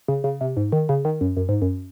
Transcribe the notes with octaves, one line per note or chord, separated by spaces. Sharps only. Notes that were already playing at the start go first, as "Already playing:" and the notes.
C#3
C#3
C3
G#2
D#3
C#3
D#3
F#2
F#2
G#2
F#2